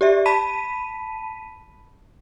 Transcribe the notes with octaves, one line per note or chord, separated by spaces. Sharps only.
G4 D5 E5
A5 B5 B6 D#7